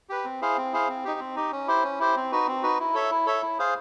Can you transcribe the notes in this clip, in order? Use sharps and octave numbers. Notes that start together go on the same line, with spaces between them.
G4 B4
C4
E4 G#4 C5 F5
C4
E4 G#4 C5 F5
C4
D#4 G4
C4
D#4 G4
C#4
E4 G4 C5
C#4
E4 G4 C5
C4
D#4 F#4 B4
C4
D#4 F#4 B4
E4
A4 C#5 E5
E4
A4 C#5 E5
E4
G#4 C5 F5